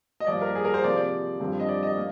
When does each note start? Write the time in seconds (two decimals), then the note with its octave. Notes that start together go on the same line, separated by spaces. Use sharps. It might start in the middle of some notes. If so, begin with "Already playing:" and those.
0.20 D#5
0.27 G2 F3 A#3 D5
0.42 A#4
0.55 G#4
0.65 A#4
0.74 C5
0.84 C3 F3 A#3 D5
0.98 D5
1.40 G2 D3 F3 C4
1.60 D#5
1.69 D5
1.83 D#5
1.97 A#3